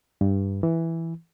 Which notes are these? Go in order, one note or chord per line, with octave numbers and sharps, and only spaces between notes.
G2
E3